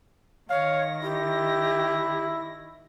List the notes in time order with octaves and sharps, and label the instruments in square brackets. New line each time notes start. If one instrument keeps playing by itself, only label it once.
[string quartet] D#3 A#6 [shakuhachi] C#5 [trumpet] F5
[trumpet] E4 [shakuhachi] G4